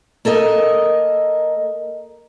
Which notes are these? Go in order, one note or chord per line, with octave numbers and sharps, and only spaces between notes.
A#3 A4 A#4 D#5